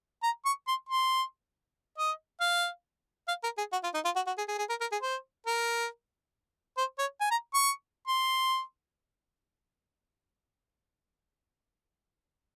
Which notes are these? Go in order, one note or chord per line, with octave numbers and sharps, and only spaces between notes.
A#5
C#6
C6
C6
D#5
F5
F5
A#4
G#4
F#4
F4
D#4
F4
F#4
F#4
G#4
G#4
G#4
A#4
A#4
G#4
C5
A#4
C5
C#5
G#5
A#5
C#6
C6